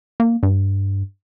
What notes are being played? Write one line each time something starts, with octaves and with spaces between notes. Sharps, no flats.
A#3
G2